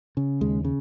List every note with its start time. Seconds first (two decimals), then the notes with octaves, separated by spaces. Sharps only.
0.17 C#3
0.41 D#2 G#3
0.65 C#3